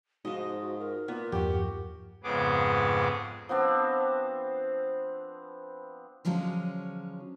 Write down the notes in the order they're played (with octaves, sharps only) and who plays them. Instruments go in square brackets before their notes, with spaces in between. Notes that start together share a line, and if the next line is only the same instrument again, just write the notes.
[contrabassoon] G#2 [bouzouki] F3 D#5 [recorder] F#4
[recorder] A#4
[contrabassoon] A#2 [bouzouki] B3
[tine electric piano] E2 G2 F3 [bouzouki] F#4 G4
[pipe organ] F2 G#2 C#3 B3 G#4 D6
[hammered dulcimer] F3 B3 C4 D4
[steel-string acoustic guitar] D3 F3 F#3 G#3 C#4